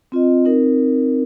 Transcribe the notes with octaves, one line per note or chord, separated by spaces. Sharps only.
C4 F4 D#5
C4 D#4 A#4